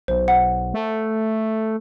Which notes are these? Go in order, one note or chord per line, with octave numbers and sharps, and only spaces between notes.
B1 C5
F#5
A3